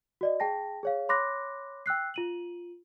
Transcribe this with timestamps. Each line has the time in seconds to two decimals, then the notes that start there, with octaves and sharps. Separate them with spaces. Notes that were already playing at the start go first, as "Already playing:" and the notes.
0.21 F#4 D5 D#5
0.40 G#4 G5 A5 A#6
0.83 G#4 C#5 F5
1.09 C#5 B5 C6 D6 F#6 A#6
1.86 G5 E6 F#6 C7
2.14 F4 D#7 F#7